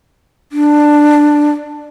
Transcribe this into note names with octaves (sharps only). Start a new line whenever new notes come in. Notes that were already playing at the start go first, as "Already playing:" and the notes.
D4